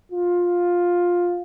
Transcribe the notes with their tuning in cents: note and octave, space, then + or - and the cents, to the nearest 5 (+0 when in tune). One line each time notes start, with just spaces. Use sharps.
F4 +10